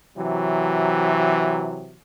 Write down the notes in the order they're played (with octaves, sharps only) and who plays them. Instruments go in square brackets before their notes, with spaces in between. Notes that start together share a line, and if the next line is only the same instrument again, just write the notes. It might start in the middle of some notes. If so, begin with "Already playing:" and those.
[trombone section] C3 E3 F#3